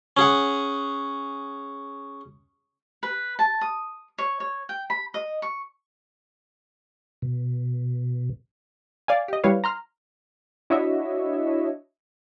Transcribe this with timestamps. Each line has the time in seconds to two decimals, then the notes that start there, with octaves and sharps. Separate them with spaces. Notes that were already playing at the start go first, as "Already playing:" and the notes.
0.17 C#4 G#4 F#5
3.03 B4
3.39 A5
3.61 D#6
4.18 C#5
4.40 C#5
4.69 G5
4.90 B5
5.14 D#5
5.42 C#6
7.22 B2
9.08 D5 F5 G#5
9.28 G4 D#5
9.44 G3 E4 B4 C#5 F5
9.64 A#5 C6 F6
10.70 D4 E4 F#4 C#5 D#5 E5